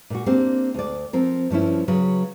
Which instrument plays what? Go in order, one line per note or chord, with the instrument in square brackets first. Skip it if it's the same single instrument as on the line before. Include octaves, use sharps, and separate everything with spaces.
[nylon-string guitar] A#2 F#4
A#3 C4 D4 G4
D2 D5
F3 C4 A#4
G2 F3 C#4 E4
C#3 F#3 B4